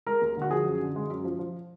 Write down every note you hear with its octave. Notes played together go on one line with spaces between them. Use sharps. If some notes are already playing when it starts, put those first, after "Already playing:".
G#3 A#4
D#2
D3 F#4
F3 G#4
F#2
D3
G#3
F#2
F3
F3